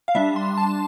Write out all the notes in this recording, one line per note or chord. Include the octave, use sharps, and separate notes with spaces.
F5
G3 D4 E5
C6
A5